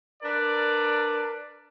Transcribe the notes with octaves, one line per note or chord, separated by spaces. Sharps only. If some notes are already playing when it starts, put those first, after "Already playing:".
D4 A#4 B4 D5